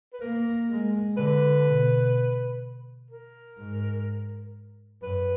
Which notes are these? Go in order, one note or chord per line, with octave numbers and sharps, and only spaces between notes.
B4
A#3 A#4
G#3
D3 B4
B2
A#4
G#2
F#2 B4